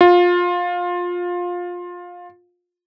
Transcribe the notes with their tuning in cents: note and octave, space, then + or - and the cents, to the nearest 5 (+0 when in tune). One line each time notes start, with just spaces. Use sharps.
F4 +20